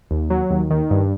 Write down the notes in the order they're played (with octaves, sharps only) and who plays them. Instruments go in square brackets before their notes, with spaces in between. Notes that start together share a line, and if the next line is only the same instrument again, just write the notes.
[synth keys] D#2
F#3
D#2
D#3
G2